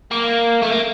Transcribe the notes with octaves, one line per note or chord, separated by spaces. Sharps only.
A#3
A3
A#3